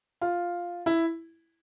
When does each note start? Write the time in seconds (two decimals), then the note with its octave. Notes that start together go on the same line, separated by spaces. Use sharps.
0.21 F4
0.86 E4